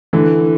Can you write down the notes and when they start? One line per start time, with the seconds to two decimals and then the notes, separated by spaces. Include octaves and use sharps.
0.13 D3 E3